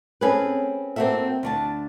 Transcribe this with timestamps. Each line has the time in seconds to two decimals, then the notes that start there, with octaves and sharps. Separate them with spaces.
0.21 C4 C#4 G#4 A4 B4
0.96 A#3 C4 D4 F#4 A4 E5
1.43 D2 D4 A5